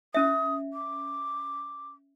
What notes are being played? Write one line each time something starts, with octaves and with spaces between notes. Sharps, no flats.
C#4 E5 D#6
D6